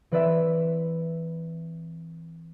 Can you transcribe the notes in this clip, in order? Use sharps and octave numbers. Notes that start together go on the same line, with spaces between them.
E3 C4 B4 D5 E5